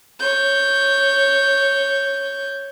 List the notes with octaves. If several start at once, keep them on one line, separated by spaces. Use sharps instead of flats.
C#5 G6